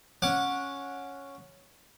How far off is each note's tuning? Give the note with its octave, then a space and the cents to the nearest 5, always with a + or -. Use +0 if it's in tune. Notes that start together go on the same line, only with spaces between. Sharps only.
C#4 +0 F#5 -20 D6 +0